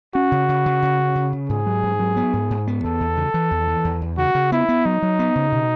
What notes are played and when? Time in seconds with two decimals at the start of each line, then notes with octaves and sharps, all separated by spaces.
0.15 C#4 F#4
0.32 C#3
0.49 C#3
0.66 C#3
0.82 C#3
0.99 C#4
1.15 C#3
1.33 C#3
1.49 G#2 G#4
1.66 F#3
1.83 G#2
1.99 F#3
2.17 B3
2.33 G#2
2.50 G#2
2.67 B3
2.84 E2 A4
3.00 E2
3.17 C#3
3.34 E3
3.51 E2
3.68 E3
3.85 E2
4.02 E2
4.18 C#3 F#4
4.35 C#3
4.52 B3 E4
4.69 B3
4.85 F#3 D#4
5.02 F#3
5.19 B3
5.36 C#3
5.52 B2